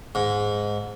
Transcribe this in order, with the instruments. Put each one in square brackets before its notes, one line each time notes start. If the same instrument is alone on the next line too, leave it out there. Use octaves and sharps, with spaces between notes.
[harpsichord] G#2